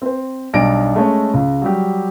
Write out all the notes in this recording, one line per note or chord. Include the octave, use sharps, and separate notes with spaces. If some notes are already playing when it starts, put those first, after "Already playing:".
C4 C5
B1 G3 D4 D#4 A#6 D7
G#3 A3 C#4 A4 C#5
C#2
F#3 G3 G4